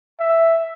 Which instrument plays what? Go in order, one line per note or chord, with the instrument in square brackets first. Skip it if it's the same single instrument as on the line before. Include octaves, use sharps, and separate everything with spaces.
[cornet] E5